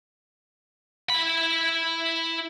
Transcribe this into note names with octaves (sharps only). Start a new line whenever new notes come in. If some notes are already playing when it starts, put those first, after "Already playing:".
E4 B5